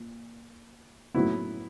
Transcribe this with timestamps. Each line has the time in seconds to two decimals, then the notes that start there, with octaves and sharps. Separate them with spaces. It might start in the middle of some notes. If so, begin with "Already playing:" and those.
Already playing: A#2
1.14 A2 F#3 B3 E4